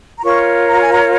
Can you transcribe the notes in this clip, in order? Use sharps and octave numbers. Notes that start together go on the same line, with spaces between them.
A#5
F4 A#4 C#5 C#6
A#5
G#5
A#5